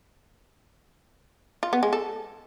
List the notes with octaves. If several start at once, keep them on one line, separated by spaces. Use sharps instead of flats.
F4
B3
G#3
A4